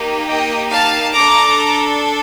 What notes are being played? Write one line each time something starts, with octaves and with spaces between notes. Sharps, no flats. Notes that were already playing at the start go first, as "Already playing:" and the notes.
Already playing: A#3 D#4 G4
D#5 G5
F5 A5
D4 A4 A#5 D6